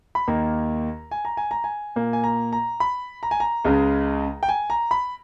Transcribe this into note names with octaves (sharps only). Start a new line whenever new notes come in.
B5
D#2 D#3 A#3 A#5
G#5
A#5
G#5
A#5
G#5
A#2 A#3
G#5
A#5
A#5
B5
A#5
G#5
A#5
C#2 C#3 G#3
G5
G#5
A#5
B5